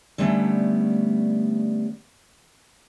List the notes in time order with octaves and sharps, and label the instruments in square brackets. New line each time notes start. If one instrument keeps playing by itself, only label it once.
[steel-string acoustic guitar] D3 G3 A3 B3 C#4